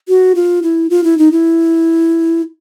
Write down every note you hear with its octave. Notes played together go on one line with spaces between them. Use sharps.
F#4
F4
E4
F4
E4
D#4
E4